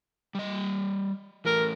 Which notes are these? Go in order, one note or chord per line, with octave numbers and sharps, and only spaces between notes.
G3 D#5
E3 A3 A#4